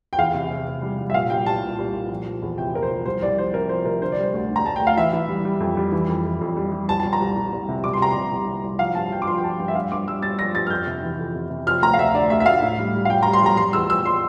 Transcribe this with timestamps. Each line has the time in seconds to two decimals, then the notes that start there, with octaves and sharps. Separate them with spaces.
0.13 G5
0.18 E2 F5
0.34 C3
0.50 C3
0.67 C3
0.82 G3
0.99 G3
1.10 E5
1.14 A#2 F5
1.30 G3 G5
1.46 C2 A5
1.63 A#2
1.79 C2
1.94 A#2
2.10 F3
2.27 F3
2.42 E2
2.58 C3 G5
2.73 F3 A#4
2.83 C5
2.90 F3
3.06 C2 C5
3.22 C2 D5
3.37 F3 C5
3.54 C3 A#4
3.69 F3 C5
3.85 C3 A#4
4.01 D3 C5
4.12 G3 D5
4.23 C5
4.34 D2
4.50 D3
4.56 A#5
4.65 D2 A5
4.76 G5
4.81 D2
4.87 F5
4.97 E3 E5
5.13 E3
5.29 G3
5.45 G3
5.60 F2
5.77 G3
5.92 E3
6.09 F2
6.25 F2
6.41 F2
6.57 G3
6.72 G3
6.88 C2 A5
7.00 C2 A5
7.13 A#5
7.20 C2
7.37 C2
7.53 C2
7.69 C3
7.84 C2 D6
7.93 C6
8.00 C3 A#5
8.10 C6
8.17 C3
8.32 C2
8.47 C3
8.64 C2
8.79 F3 F5
8.95 G2 A5
9.06 A5
9.11 F3 G5
9.22 D6
9.27 F3 C6
9.38 G5
9.44 F3 A5
9.59 G2 G5
9.68 E5
9.75 G2 F5
9.92 G2 D6
10.07 G2 E6
10.23 G2 A6
10.39 F3 A#6
10.55 G2 A6
10.67 F6
10.70 F2 G6
10.87 C3
11.03 E3
11.19 F2
11.35 C3
11.50 C3
11.66 F3 F6
11.82 D2 A#5
11.94 F5
11.98 D2 E5
12.14 D3 D5
12.30 D2 E5
12.40 E5
12.46 D2 F5
12.62 A2
12.79 G3
12.94 G3
13.05 F5
13.09 G3 G5
13.23 G3 A#5
13.33 C6
13.42 G3 A#5
13.57 G3 C6
13.73 E2 E6
13.90 E2 E6
14.05 C6